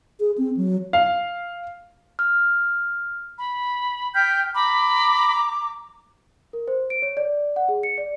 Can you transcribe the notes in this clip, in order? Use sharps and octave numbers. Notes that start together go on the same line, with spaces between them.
G#4
C4
F#3
F5
F6
B5
G5 F6 G6 B6
A#5 B5 D6
A#4
C5
D7
C#5
D5
F#5
G#4
C#7
D5